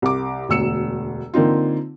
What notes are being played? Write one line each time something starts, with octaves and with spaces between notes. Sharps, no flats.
C2 D6
E1 D2 E6 C#7 E7
D3 A#3 C4 D#4 F4